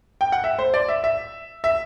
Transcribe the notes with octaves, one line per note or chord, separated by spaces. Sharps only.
G5
F#5
E5
C5
D5
E5
E5
E5